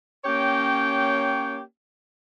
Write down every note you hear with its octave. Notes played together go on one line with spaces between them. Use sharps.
A#3 C#4 G4 C#5 G5